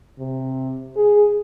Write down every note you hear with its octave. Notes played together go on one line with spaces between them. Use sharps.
C3
G#4